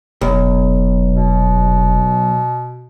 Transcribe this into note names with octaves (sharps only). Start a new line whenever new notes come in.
F1 B1
B2